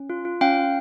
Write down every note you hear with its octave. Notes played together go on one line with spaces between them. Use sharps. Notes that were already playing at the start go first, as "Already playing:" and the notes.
Already playing: C#4
F4
F4
C#4 F5 G5
C#4